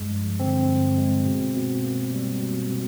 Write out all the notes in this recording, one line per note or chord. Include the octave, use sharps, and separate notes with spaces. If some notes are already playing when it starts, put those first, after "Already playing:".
Already playing: G2 G#3
F3
D3 C4
G2
G#3
B2
B2
A#3
G3
B2
B2